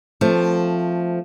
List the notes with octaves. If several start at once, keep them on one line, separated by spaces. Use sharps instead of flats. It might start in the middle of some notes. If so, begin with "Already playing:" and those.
F3 A3 C4